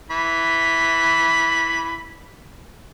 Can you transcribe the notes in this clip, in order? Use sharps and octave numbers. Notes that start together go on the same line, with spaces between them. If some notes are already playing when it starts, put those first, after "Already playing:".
E3 B5